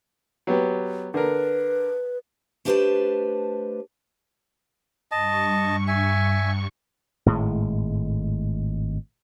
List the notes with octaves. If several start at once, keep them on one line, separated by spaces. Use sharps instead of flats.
F#3 B3 G4
D3 A#4 B4
A3 D4 G4 B4 C5 A5
G2 D#5 A5 C#6
E5 G#5
G#1 A2 G#3